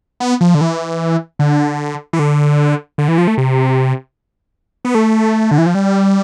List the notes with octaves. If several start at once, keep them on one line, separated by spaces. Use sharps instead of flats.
B3
F3
D3
E3
D3
E3
D3
D3
E3
F3
A3
C3
B3
A3
D3
E3
F3
G3